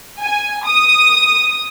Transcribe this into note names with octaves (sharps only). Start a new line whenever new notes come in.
G#5
D#6